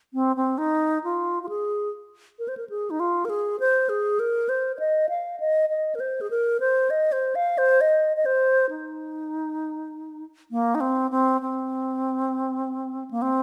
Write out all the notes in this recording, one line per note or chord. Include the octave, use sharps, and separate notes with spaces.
C4
C4
D#4
F4
F4
G#4
A#4
C5
A#4
G#4
D#4
F4
A#4
G#4
C5
G#4
A#4
C5
C5
D#5
F5
D#5
D#5
A#4
C5
G#4
A#4
C5
D#5
C5
F5
C5
D#5
D#5
C5
D#4
A#3
D#4
C4
C4
C4
A#3
C4